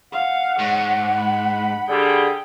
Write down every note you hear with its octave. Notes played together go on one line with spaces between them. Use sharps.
F5 F#5
G#2 C#5
B5
D3 G3 G#4 G5